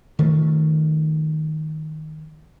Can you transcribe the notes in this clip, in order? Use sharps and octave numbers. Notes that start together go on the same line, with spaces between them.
D#3 F3 A3